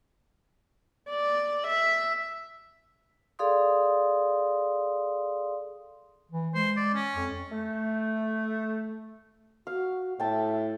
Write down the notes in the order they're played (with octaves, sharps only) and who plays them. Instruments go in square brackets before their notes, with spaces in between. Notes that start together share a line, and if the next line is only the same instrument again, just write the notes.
[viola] D5
E5
[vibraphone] G#4 A4 D5 F5 C6 D#6
[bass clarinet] E3
[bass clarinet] G#3 [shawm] C5
[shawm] D5
C#4
[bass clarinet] F2
[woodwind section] A3
[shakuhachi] F#4 [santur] F5
[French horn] A2 [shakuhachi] E5 [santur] G5 A5